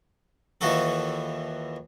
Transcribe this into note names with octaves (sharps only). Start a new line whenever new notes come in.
D#2 E3 F3 F#4 A4